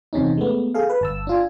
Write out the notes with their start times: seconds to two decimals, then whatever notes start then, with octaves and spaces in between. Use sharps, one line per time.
0.13 E2 C3 C#4 D#4
0.37 G#3 A3 B3
0.74 G#4 A4 F5
0.90 B4
1.01 G1 A5 E6
1.27 D4 F4 G#5